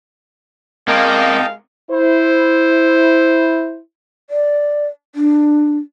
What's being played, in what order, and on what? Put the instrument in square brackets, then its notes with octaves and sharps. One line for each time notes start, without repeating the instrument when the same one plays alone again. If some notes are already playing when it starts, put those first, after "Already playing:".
[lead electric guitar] C3 A#4 [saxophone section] G#3 F5 [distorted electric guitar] A#3 [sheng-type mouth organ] D#5 G5 A5
[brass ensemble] E4 C5
[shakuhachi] D5
D4